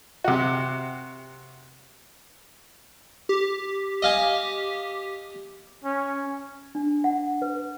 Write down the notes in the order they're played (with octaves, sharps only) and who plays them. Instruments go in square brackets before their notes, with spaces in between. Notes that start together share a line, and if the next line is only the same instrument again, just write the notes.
[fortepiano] C3 F#4
[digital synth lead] G4
[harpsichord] D#5 F5 G#5
[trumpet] C#4
[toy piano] D4
F#5
B4